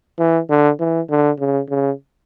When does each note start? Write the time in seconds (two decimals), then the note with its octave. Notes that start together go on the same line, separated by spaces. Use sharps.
0.19 E3
0.50 D3
0.80 E3
1.10 D3
1.39 C#3
1.70 C#3